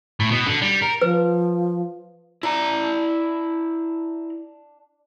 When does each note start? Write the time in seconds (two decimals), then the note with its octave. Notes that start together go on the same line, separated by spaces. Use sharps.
0.20 A2
0.31 B2
0.47 D3
0.62 G3
0.82 A#4
1.02 F3 B4
2.43 D4 E4 A#5